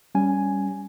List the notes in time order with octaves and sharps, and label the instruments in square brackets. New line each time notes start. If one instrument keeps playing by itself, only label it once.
[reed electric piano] G3 C#4 G#5